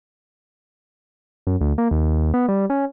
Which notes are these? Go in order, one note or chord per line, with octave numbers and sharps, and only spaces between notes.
F#2
D2
A#3
D#2
B3
G3
C#4